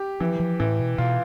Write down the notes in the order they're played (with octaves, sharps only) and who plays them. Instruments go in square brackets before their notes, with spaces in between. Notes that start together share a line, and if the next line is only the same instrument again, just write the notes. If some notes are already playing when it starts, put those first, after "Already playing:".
Already playing: [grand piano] G4
[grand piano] E3 [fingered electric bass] F3
[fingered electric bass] F3
[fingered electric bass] A2 [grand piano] E3
[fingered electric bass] B2
[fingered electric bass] B2 [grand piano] F4